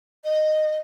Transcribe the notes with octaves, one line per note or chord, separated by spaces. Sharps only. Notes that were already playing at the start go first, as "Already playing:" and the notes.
D#5